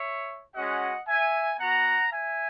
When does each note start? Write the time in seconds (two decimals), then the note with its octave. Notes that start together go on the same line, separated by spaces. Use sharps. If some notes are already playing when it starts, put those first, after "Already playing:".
Already playing: C#5 E5
0.54 G#3 C#4 F#4 D#5 F#5
1.07 E5 G#5
1.59 B3 F#4 F#5 A#5
2.12 E5 G#5